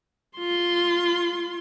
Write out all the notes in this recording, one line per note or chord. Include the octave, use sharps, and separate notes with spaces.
F4 C6